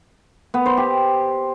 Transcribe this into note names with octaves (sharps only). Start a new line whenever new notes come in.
B3
C5
G4